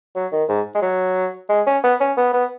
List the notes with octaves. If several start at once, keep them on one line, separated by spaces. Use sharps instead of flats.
F#3
D#3
G#2
G#3
F#3
G#3
C#4
B3
C#4
B3
B3